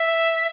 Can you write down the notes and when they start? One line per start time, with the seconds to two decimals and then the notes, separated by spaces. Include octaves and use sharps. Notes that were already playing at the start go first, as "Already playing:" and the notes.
Already playing: E5